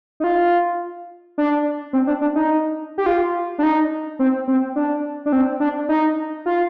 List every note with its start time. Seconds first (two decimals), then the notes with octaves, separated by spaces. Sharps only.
0.20 D#4
0.24 F4
1.38 D4
1.93 C4
2.07 D4
2.21 D4
2.35 D#4
2.98 G4
3.06 F4
3.59 D4
3.63 D#4
4.19 C4
4.48 C4
4.76 D4
5.26 D4
5.33 C4
5.60 D4
5.89 D#4
6.46 F4